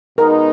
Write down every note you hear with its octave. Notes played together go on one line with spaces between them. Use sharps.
B2 G#3 B3 D#4 A#4